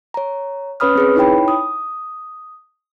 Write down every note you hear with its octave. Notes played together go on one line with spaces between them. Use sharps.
C#5 A#5
C#4 B4 C#5 B5 D#6 F6
C4 G#4 B4
D#4 E4 C#5 G5 B5
D#6